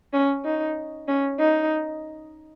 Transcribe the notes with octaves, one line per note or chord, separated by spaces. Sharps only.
C#4
D#4
C#4
D#4